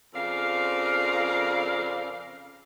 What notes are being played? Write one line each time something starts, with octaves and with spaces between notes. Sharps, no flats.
F2 C#3 C4 A#4 D5 F5